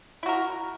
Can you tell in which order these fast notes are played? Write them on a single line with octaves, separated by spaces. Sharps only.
E4 F#4 A#4